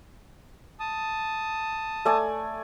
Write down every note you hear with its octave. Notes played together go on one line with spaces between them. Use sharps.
A5 D#6
A3 D5 G#5